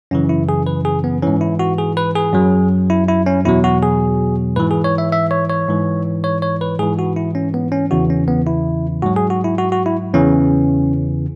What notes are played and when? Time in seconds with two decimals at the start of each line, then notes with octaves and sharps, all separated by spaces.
0.11 F#2 C#3 E3 C#4
0.29 E4
0.49 G#4
0.67 B4
0.85 G#4
1.04 B3
1.22 G#2 E3 C#4
1.41 E4
1.59 F#4
1.78 G#4
1.97 B4
2.15 G#4
2.33 F#2 F#3
2.90 E4
3.08 E4
3.26 C#4
3.45 E2 B2 F#3 E4
3.64 F#4
3.83 G#4
4.56 G#2 E3 B4
4.71 G#4
4.84 C#5
4.98 E5
5.12 E5
5.31 C#5
5.49 C#5
5.68 G#2 E3
6.24 C#5
6.42 C#5
6.61 B4
6.79 G#2 E3 G#4
6.99 F#4
7.16 E4
7.35 C#4
7.54 B3
7.72 C#4
7.91 E2 C#3 E3 F#4
8.10 C#4
8.28 B3
8.47 E4
9.03 G#2 F#3 F#4
9.16 G#4
9.30 F#4
9.44 E4
9.58 F#4
9.72 F#4
9.86 E4
10.14 E2 C#3 E3 C#4